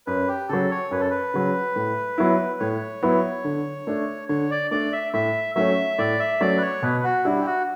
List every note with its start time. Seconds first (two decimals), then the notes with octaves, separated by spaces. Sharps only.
0.07 F#2 B4
0.28 G4
0.49 C#3 F#3 A4
0.71 C#5
0.91 F#2 B4
1.01 A4
1.10 B4
1.34 C#3 F#3
1.76 A2
2.18 F#3 B3 E4
2.60 A2 C#5
3.02 F#3 B3 E4
3.44 D3
3.87 A3 D4
4.29 D3 C#5
4.51 D5
4.71 A3 D4 D5
4.93 E5
5.14 A2 E5
5.55 F#3 A3 C#4 E5
5.98 A2 D5
6.19 E5
6.41 F#3 A3 C#4 D5
6.57 B4
6.62 C#5
6.82 B2 B4
7.04 F#4
7.25 G3 D4 E4
7.41 G4
7.46 F#4